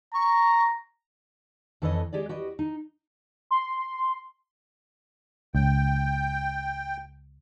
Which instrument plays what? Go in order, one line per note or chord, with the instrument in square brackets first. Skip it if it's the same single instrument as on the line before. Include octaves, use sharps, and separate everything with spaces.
[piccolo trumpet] A#5 [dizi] C#6
[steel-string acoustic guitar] F2 E3 A4 B4 C#5 D#5
G#3 G4 G#4 D5
F#4 G4 B4 D#5
D#4
[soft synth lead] C6
[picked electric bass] C#2 [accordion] G5